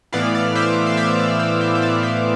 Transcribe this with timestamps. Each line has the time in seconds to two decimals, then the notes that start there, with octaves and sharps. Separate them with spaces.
0.12 A2 E3 B3 E4 D5 F5
0.35 D5
0.55 C5 E5
0.87 F5
0.97 C5 E5
1.19 D5
1.39 C5
1.61 C5
1.75 C5
1.82 D5
2.03 C5 E5